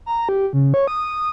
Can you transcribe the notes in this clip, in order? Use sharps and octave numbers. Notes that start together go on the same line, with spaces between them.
A#5
G4
C#3
C#5
D#6